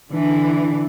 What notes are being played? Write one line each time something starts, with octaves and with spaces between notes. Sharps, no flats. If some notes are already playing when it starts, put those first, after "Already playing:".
D3 E3 D4